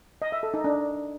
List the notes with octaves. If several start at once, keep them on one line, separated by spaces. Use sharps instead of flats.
D#5
E5
A4
D#4
D4